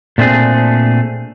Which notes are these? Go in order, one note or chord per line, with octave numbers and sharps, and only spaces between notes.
A#2 A3 C4 D4 G#4